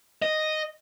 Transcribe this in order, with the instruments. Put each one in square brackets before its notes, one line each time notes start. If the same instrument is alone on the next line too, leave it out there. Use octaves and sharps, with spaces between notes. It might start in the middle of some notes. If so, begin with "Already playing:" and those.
[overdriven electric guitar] D#5